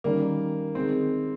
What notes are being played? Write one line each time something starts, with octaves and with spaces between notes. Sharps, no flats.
D#3 G3 A#3 C#4
D#3 G#3 C4 D#4